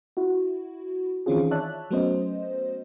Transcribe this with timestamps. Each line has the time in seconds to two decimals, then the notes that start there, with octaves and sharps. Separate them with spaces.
0.17 E4 F#4
1.26 D#3 E3 C4 C#4 F4 G#4
1.51 C#5 D5 E5 A5 F#6
1.91 F#3 A3 B3 C#4 C5 D#5